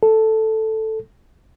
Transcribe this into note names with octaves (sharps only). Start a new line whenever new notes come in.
A4